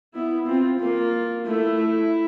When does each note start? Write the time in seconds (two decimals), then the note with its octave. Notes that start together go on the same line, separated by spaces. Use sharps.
0.14 B3 E4
0.47 C4 F4
0.80 A#3 F4
1.46 A3 E4